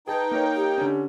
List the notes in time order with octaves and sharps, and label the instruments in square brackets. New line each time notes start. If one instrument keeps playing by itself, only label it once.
[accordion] D#4 G5 [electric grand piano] G#4 A5 A#5 [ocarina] B4
[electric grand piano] A#3 A#4 C#5
[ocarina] G4
[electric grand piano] D3 C#4